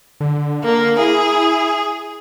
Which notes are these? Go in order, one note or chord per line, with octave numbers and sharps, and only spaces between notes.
D3
D3 A#3
E4 G#4